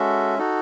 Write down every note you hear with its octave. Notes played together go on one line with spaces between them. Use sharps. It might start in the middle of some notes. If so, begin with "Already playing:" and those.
Already playing: G#3 C#4 F#4 A4 E5
D#4 F#4 A4